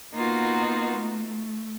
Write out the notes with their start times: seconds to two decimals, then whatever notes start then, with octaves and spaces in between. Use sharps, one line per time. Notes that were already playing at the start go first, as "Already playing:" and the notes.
0.13 A#3 B3 D#4 F4 F#4
0.96 A3